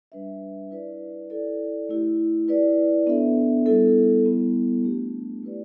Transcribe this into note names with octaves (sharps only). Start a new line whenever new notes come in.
G3 D4 B4 E5
E4 B4 D5
E4 A4 D5
A3 E4 G4
E4 B4 D5
B3 D4 A4 E5
G3 B3 E4 A4
G3 B3 E4
A3 D4 G4
A3 E4 B4 D5